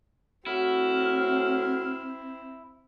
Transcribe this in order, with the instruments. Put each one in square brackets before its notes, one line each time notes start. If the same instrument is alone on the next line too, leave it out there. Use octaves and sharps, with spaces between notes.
[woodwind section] A2 F6 [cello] C4 [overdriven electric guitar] E4 [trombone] F#4